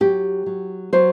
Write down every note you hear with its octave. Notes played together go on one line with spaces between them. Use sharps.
F#3 G4
F#3
F#3 C5